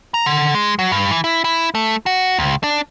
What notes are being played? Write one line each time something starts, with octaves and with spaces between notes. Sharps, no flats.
A#5
D3
G#3
F#3
G2
E3
E4
E4
A3
F#4
C#2
D4